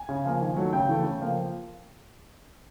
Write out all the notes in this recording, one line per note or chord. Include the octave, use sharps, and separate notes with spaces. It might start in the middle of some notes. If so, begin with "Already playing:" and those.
Already playing: G#5
C#3
F3 A#3
D#3
F#3 A3
C#3 G5
E3 A3
C#3
F3 A#3